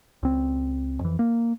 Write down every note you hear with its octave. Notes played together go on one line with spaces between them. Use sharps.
C#2 C4
F2 E3
A#3